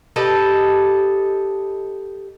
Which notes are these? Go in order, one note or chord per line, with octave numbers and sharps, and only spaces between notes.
G4 A4 B4 D#5